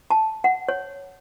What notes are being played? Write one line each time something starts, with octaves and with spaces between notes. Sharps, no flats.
A5
F#5
C#5